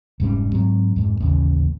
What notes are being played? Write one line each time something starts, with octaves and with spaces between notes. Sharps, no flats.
F1 G#2 G3 C#4
G#2 F#3 C4
F2 G#2
A1 D#2 C#3